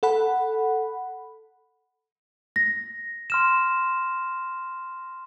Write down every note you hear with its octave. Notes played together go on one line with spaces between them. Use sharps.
A4 F#5 B5
A#6
C6 F6 E7